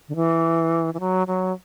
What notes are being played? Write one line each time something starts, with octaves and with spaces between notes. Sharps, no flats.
D3
E3
E3
F#3
F#3